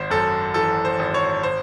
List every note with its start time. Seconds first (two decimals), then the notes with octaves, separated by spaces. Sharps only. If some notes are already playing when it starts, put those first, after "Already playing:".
Already playing: G#1 C5
0.10 F#2 A4
0.54 E3 A4
0.85 C5
0.99 G#1
1.14 C#5
1.43 C5